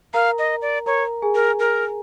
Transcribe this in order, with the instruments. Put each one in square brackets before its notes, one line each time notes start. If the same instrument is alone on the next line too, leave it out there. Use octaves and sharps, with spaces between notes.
[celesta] A#4 A#5 [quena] F5
[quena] D#5
D5
[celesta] A#4 A#5 [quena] C#5
[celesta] G#4 G#5
[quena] A#4
A#4